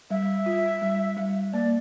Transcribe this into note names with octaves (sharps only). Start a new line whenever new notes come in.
G3 E5
F4
G3
G3
A#3 D5